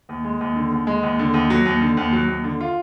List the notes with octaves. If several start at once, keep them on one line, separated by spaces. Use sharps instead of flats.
D#2
G#3
D#2
D3
D#2
G#3
D#2
D3
D#2
F#3
D#2
D3
D#2
F#3
D#2
D3
F4